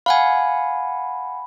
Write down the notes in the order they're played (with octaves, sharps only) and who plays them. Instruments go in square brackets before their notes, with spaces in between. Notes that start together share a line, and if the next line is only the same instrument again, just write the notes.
[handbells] F5 F#5 G#5 [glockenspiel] B5